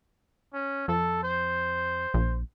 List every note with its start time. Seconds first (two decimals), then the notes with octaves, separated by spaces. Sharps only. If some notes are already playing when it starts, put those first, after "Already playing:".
0.54 C#4
0.88 F2 A4
1.23 C5
2.14 A#1